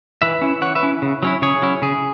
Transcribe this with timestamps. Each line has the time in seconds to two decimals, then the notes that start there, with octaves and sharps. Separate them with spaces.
0.22 E3 B4 E5
0.42 C#4 E4
0.62 E3 C#5 F#5
0.75 B4 E5
0.83 C#4 E4
1.02 C#3
1.23 F#3 C#4 E4
1.42 C#3 G#4 C#5
1.62 F#3 C#4 E4
1.82 C#3 G#4